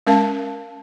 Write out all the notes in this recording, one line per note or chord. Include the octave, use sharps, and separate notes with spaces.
G#3 C#4 A#4 F5 A5